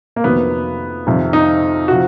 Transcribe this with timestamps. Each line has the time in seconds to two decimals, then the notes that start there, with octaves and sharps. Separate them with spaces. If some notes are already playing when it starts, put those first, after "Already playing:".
0.16 A#3
0.24 F2 C3 D#3 F#3 B3
1.07 F2 C3 D#3
1.33 D#4
1.88 C3 F3 F#4